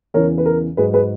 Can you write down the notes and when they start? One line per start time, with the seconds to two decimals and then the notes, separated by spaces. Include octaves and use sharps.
0.14 E2 C#3 E3 A#4 C#5
0.38 B4
0.46 A#4
0.77 G#2 F#3 G#4 B4
0.93 G#4 B4